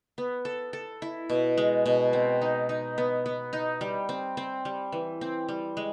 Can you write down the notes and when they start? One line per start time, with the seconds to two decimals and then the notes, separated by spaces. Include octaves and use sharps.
0.18 B3
0.45 A4
0.73 A4
1.02 E4
1.30 B2
1.58 G#3
1.86 B2
2.13 C4
2.41 D#4
2.69 D#4
2.98 B3
3.26 B3
3.53 D#4
3.81 G3
4.09 C4
4.37 C4
4.65 G3
4.92 E3
5.21 C4
5.49 G3
5.77 G#3